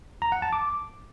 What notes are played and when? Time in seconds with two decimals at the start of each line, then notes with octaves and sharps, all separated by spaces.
0.22 A#5
0.32 F#5
0.42 A5
0.53 D6